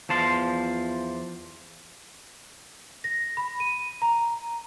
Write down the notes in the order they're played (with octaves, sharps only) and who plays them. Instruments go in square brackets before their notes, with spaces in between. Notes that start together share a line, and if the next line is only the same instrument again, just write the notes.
[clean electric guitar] E2 F3 A5 C6
[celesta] A#6
B5
D#7
A#5